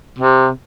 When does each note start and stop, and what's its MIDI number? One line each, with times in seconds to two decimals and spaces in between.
0.19 0.49 48